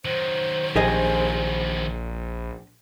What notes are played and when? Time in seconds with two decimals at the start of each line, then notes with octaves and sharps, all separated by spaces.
0.05 D#3 F#3 C5
0.76 A#1 G4 G#4 D#5